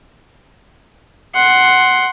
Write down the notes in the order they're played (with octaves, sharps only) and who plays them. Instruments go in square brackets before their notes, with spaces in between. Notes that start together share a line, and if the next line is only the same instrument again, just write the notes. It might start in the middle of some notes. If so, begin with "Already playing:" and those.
[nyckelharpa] F#5 C6